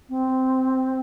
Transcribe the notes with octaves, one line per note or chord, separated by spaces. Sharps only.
C4